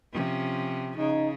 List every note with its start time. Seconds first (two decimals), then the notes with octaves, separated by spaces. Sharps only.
0.13 C3 F3 C#4
0.97 C#3 D#4